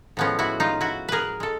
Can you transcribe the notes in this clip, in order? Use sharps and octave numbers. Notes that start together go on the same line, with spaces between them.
A2 F3 G#3 B3 C#4
E4 F#4
D#4 F4
E4 F#4
G#4 A#4 B4
G#3 A4